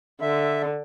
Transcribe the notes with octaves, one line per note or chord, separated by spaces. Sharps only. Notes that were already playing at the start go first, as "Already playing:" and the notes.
D3 E5